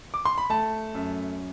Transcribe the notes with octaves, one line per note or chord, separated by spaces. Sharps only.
D6
C6
B5
A3 A5
F#2